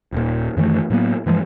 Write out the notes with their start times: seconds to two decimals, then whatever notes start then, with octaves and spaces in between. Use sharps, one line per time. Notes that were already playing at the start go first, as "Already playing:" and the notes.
0.12 D#1 A#2
0.57 F#2 D#3 E3 A3
0.90 A2 F#3 A#3 B3
1.26 G2 E3 F3 G#3